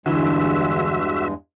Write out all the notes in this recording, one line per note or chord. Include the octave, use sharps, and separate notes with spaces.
E2 G2 D3 E3 G#3 F#4 E5